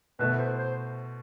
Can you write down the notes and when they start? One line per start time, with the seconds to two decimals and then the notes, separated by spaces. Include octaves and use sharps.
0.19 B2 A3 E4 B4
0.39 C5
0.58 C5